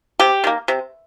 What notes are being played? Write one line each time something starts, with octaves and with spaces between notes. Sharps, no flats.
C3 G4
D#3 A#3
C3